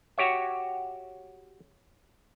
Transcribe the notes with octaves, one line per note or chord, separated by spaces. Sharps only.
F#4 G4 C#5 E5